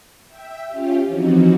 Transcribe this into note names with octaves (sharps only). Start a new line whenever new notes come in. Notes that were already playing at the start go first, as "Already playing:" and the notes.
E5 G5
C#4 F4 G4
E3 F3 C4 D#4 F#4